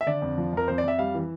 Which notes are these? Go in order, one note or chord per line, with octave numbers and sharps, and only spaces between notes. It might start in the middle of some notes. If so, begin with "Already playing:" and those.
E5
D3 D5
F2
F3
F2 A#4
F2 C5
D5
F2 E5
G3 F5
E3